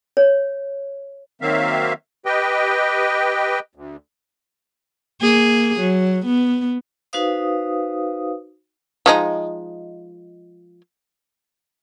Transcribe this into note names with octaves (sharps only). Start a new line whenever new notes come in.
C#5
D#3 F#3 A#3 C4 E5 F5
G4 B4 D#5 G5
D2
A#3 G#4
F#3
B3
D#4 F#4 B4 C5 F5 D#6
F3 G#3 D#4